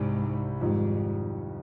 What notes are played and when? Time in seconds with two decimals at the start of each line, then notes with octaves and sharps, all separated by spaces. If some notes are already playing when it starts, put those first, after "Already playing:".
Already playing: C2 G#2 C3 G3
0.60 F2 G#2 D#3 G3